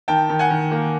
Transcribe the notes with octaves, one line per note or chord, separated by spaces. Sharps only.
D#3 G5 A5
D#3
F#5 G#5
D#3
A#3